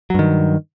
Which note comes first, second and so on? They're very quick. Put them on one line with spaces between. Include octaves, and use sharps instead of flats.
F#3 G2 D#3